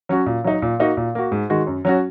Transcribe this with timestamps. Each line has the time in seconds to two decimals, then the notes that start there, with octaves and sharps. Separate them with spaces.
0.09 F#3 C#4 F#4
0.26 A#2
0.44 F#3 D#4
0.62 A#2
0.80 A#3 D#4 F#4
0.97 A#2
1.15 A#3 F#4
1.32 G#2
1.50 D#3 G#3 F#4
1.67 F#2
1.85 F#3 C#4 F#4